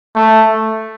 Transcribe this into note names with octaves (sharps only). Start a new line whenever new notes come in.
A3